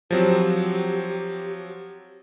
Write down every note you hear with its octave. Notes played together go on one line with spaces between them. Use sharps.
F3 F#3 C4 G4